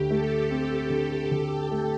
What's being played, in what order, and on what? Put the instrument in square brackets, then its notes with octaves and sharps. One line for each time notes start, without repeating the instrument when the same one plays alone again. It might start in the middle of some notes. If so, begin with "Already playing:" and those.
Already playing: [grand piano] D2 D3 [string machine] G4
[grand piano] A3 [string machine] A4
[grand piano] C4
D3
D2
A3